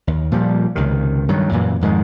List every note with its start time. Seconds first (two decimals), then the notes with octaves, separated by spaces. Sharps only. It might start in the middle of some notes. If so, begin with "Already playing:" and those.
0.07 D#2
0.31 A#2 F3 G3
0.75 C#2 C3 D#3
1.29 G2 D#3 F#3
1.52 F#2 A#2 E3
1.81 F2 G#2 D#3 G#3